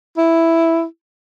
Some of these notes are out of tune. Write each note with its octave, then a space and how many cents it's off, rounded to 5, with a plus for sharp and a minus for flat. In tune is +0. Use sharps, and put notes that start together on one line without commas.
E4 +0